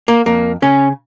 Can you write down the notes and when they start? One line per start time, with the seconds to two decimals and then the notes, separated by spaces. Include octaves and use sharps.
0.08 A#3
0.26 F2 A#3
0.62 C#3 C#4